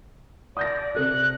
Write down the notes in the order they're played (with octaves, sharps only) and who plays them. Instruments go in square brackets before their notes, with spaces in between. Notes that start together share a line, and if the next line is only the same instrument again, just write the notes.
[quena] D5 [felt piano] D#6 G6 A#6
[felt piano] C3 A4 D5 [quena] F#6